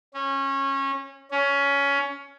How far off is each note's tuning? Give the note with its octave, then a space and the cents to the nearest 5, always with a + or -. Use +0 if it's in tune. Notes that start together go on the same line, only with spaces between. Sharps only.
C#4 -20
C#4 +15